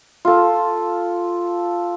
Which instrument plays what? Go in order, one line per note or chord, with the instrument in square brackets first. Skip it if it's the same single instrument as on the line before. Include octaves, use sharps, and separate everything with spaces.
[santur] F4 A4